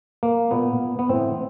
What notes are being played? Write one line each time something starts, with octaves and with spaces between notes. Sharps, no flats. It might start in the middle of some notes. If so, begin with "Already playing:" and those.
A#3
A#2 B3
B3
A2 E3 C4